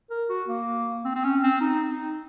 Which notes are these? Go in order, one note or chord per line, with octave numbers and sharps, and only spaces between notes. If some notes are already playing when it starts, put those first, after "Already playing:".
A#4
F#4
A#3
C4
C4
C#4
C4
D#4
D#4